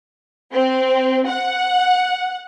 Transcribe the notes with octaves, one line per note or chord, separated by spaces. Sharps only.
C4
F#5